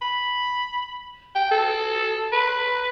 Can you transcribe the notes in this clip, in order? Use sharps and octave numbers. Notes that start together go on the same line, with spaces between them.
B5
G5
A4
B4